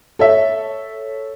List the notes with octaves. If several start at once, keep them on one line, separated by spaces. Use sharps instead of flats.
A4 C#5 E5